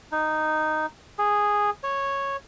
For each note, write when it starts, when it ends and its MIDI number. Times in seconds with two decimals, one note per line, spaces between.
0.12 0.86 63
1.19 1.70 68
1.83 2.36 73